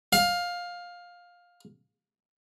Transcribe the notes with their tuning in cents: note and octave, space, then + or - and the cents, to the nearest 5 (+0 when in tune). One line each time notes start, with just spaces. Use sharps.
F5 +15